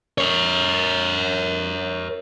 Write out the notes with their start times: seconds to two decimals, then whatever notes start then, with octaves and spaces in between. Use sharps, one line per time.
0.18 A#4 C#5